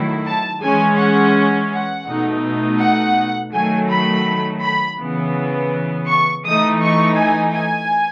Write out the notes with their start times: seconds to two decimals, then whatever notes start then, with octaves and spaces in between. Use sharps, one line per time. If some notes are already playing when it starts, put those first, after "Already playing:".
Already playing: D#3 F#3 A3 E4
0.26 A5
0.62 E3 G#3 C#4 G#5
0.99 F#5
1.72 F#5
2.07 B2 A3 D#4
2.81 F#5
3.53 D#3 F#3 A3 G#5
3.89 B5
4.62 B5
4.99 C#3 E3 B3
6.07 C#6
6.44 E3 A3 D#4 D#6
6.81 C#6
7.16 G#5
7.54 G#5